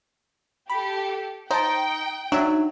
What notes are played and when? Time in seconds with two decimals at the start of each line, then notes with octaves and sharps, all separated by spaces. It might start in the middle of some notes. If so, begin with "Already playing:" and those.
0.70 G4 A4 B5
1.51 D#4 C5 G5 A5
2.32 F#3 D4 D#4 E5